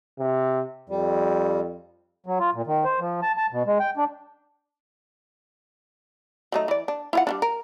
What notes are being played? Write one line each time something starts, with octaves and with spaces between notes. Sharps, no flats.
C3
F2 G3
F#3
F4
A#2
D#3
C5
F3
A5
A5
B2
G#3
G5
D4
F#3 A3 D#4
E3 D5
D4
E4 F4 F#5
G3 A3 D4
A#4